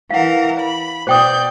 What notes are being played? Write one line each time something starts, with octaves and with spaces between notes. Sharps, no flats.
E3 A#4 F5 F#5
B5
B2 C5 D5 G5 D#6 G6